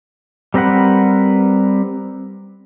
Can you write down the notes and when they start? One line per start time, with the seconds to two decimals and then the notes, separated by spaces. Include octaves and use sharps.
0.54 G3 C4 A#4 B4 F#5